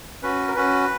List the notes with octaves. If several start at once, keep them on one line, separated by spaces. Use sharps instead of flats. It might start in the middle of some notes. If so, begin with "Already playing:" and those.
C#4 F#4 B4
A#4
C#4 F#4 B4